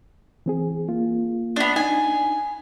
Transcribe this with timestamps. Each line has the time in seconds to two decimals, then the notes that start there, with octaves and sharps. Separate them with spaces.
0.46 E3 C4 G#4
0.89 A#3 F4
1.56 B3 D4
1.76 D4 D#4 G#5